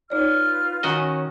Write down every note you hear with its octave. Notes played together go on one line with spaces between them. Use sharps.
D#4 F4 B4 C#5 D5 F6
D#3 C#4 F#4 D#5